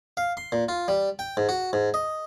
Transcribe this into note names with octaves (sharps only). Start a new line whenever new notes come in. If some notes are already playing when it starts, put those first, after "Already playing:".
F5
C6
A#2
F4
G3
G5
G#2
F#4
G#2
D#5